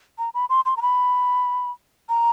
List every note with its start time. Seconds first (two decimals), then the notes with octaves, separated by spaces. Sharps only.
0.18 A#5
0.34 B5
0.50 C6
0.66 C6
0.77 A#5
0.82 B5
2.09 A#5